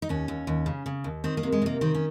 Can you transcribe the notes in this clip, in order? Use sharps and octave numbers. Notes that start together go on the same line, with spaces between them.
D#4
D#2 C#4
D#2
D#2
C#3
C#3
D#2
D#3 C4
A#3
C3
G#3
C3 A#3
D#3 C4
C#4